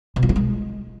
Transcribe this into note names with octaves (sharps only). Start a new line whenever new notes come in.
B2
F3
E3
G#3